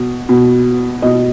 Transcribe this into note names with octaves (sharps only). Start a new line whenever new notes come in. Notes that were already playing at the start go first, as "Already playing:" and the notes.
Already playing: B2
B2
B2 D#5